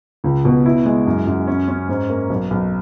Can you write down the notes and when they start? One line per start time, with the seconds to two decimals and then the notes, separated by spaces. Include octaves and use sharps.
0.24 C#2
0.45 B2
0.66 E4
0.86 G#3
1.07 F#2
1.27 F#2
1.47 C#4
1.68 C#4
1.89 G#2
2.09 A#3
2.30 B1
2.51 B1